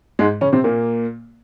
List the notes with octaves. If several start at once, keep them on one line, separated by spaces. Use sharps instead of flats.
G#2 G#3
C#3 C#4
C3 C4
A#2 A#3